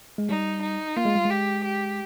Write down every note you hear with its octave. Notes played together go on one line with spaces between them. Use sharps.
G#3
G3 D#4
D#4
A#3 F4
G#3
G3
G#3
G4
G4